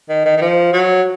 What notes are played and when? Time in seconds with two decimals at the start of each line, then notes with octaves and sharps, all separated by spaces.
0.09 D#3
0.26 D#3
0.37 D#3
0.41 F3
0.73 F#3